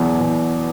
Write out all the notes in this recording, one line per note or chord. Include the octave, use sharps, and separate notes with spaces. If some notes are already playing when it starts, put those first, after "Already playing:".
Already playing: E2 B2 F#3
E2